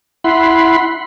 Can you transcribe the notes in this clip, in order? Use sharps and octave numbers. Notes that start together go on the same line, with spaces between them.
E4 F#5 B5 C6